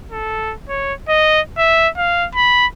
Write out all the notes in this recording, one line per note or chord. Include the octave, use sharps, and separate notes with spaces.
A4
C#5
D#5
E5
F5
B5